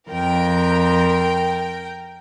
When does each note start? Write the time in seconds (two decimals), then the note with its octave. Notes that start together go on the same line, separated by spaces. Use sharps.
0.10 F2 A#4 G5